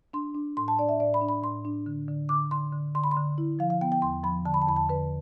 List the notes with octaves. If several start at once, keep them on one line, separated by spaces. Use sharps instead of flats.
D4 C6
D4
A2 C6
A5
D4 D5
E5
A2 D5
B5
D4
B5
A2 C6
D4
D3
D3
D3 D6
D3 C6
D3
D3 C6
B5
C6
D3
E4
F3 F5
F5
B3 G5
G5
E2 C6
F3 B5
D3 A5
B5
A5
E2 B5
A5
D3 B4